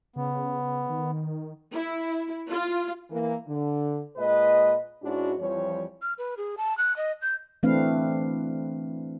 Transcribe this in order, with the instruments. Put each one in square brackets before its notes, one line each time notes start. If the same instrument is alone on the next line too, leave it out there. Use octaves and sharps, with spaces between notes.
[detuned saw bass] C#3 [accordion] B3
[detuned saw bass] D#3
[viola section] E4
F4
[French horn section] E3 A#3
D3
A#2 G#3 B4 D#5
G#2 C#4 D4 E4 F#4
F2 E3 F3 G3 C#5
[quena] F6
B4
G#4
A5
F#6
D#5
G6
[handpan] E3 A3 C4 D4 B4 F5